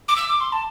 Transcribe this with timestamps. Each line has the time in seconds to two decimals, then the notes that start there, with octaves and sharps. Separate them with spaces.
0.08 D6
0.16 E6
0.29 D6
0.40 C6
0.52 A5